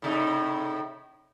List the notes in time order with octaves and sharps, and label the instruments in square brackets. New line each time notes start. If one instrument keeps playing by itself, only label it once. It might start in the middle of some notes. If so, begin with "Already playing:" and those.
[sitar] A2 C3 D#4